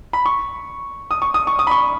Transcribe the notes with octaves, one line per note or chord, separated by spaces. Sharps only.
B5
C#6
D#6
C#6
D#6
C#6
D#6
B5
C#6